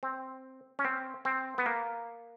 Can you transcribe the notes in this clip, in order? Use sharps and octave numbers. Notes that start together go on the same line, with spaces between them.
C4
C#4
C4
C4
B3
A#3